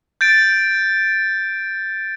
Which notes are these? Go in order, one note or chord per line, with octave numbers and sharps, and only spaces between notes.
G6 A6 D7